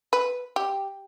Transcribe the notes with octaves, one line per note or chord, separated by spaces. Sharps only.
B4
G4